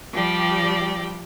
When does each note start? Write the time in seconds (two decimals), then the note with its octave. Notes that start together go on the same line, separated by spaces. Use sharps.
0.13 F3 G3 G4 D5 G5